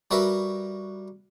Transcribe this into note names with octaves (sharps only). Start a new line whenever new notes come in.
G3 F#4 A#4 B4 E5